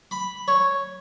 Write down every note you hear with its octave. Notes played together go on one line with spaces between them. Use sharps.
B5
C#5